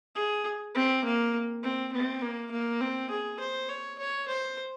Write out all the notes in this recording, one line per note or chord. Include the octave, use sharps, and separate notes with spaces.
G#4
C4
A#3
C4
C4
A#3
A#3
C4
G#4
C5
C#5
C#5
C5